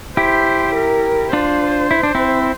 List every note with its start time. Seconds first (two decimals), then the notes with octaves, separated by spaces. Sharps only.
0.17 E4 G4 C5
0.75 A#4
1.33 D4 F4 C5
1.91 E4
2.03 D4
2.15 C4 E4